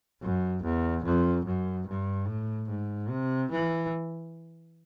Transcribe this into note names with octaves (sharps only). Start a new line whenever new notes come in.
F#2
E2
F2
F#2
G2
A2
G#2
C3
E3